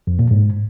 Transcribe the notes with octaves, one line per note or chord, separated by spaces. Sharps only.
F2
A#2
G#2